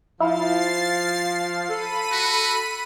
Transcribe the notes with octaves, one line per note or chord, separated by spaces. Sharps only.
F3 E4 F5 A6 C7
A4 B5 D#7
F#4